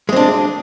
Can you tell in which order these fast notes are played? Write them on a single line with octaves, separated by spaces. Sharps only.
G#3 C4 D4